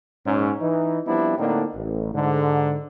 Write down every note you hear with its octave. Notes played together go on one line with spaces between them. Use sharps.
A#1 G#2 C#4
E3 D#4
F3 G3 B3 C4 D4 E4
A2 D3 A#3 C4 D4 D#4
A1
G#2 D3